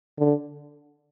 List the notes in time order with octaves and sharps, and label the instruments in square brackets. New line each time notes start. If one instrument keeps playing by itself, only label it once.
[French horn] D3